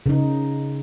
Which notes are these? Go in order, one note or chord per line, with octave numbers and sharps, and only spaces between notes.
C#3 D#4